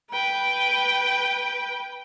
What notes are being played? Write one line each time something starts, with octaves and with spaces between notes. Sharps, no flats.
B4 G5